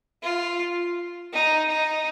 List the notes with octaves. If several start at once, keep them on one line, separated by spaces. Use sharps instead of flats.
F4
D#4
D#4